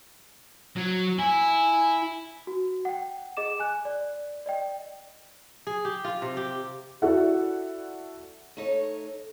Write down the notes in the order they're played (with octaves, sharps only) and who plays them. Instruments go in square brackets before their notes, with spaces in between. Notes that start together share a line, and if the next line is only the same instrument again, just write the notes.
[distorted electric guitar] F#3
[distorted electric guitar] E4 [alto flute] G#5
[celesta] F#4
F#5 G5
G#4 D#5 D6 E7
G#5 F#6
D5
D5 D#5 G5
[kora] G#4
G4
F4
C3
G4
[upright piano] E4 F#4 A4 D5 E5 F#5
[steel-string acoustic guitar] A3 D#4 C#5